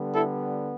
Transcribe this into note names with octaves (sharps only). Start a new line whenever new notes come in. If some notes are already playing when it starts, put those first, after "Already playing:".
Already playing: D3 G3 B3
E4 A4